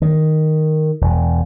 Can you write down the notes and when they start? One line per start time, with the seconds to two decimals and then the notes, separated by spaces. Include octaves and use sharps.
0.02 D#3
1.01 E1